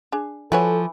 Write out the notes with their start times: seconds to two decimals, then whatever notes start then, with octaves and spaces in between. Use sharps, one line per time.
0.12 D4 G#4
0.52 E3 F3 F#4 A4 B4 C#5